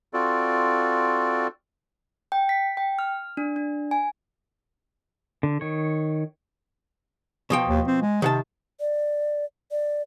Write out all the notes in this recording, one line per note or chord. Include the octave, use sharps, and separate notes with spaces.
C4 F4 F#4 A4 D5
G5
B6
G5
F6
D4
D4
G#5
D3
D#3 C#5
B2 F3 G5
D#2
C4
G#3
C3 D#3 F#5 A5
D5
D5